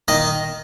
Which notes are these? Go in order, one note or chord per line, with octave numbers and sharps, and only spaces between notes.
D#3 D#5